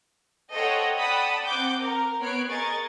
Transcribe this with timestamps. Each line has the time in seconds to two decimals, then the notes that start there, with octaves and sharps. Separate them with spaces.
0.52 A4 C5 C#5 D#5 F#5 G5
0.97 D5 F#5 G5 A5 B5 D#6
1.45 C4 F#5 D6 G6
1.81 A#4
2.21 B3 C#5 B5 F#6 C7 D7
2.50 G#4 A#4 D#5 C#6 G#6 A6